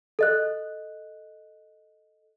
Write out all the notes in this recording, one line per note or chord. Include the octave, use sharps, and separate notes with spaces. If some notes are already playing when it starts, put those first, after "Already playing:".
A4 D#5 F#6